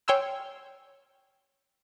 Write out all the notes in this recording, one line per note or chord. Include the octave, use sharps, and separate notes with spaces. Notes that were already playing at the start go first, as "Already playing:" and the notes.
C#5 G5 G#5 C6 E6 F6